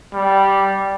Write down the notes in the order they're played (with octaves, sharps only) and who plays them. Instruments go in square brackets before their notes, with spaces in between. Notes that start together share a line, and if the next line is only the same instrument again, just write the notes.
[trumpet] G3